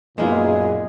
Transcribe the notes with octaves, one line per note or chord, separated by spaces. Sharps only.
B1 F#2 A#2 G#3 A#3 B3 F4 G#4